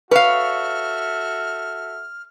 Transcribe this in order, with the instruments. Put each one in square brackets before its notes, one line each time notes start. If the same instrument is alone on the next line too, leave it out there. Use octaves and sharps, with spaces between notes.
[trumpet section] F#4 A4 E5 [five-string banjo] B4 [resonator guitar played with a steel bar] C#5 F5 [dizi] F6